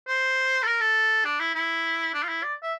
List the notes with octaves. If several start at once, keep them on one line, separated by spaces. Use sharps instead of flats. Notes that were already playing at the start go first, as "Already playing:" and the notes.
C5
A4
A#4
A4
D4
E4
E4
D4
F4
E4
D5
E5